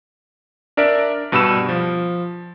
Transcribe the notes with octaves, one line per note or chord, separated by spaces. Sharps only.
D4 A#4 D5 E5 D7
G2 B2 G3 B5 E6 E7
F3